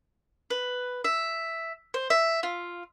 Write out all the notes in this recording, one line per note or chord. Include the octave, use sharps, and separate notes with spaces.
B4
E5
C5
E5
F4